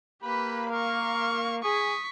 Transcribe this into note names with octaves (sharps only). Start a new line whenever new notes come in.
A#3 G4 B4 B5
A#4 F5 C#6
G#4 C#6 D#6 B6